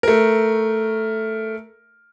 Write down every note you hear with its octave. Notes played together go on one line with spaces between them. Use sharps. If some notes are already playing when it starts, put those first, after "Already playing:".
A3 A#4